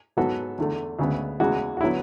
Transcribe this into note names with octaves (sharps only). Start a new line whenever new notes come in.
G#2 F#3 B3 F#4 A4
E2 D3 A3
D2 C#3 G#3 B3
E2 C#3 E3 G#3 F#4
F#4
D3 F#3 B3 E4